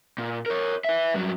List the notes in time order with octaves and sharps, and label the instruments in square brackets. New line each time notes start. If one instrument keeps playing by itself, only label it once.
[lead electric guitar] A#2
A#4 C#5
B4 E5
G2 F#3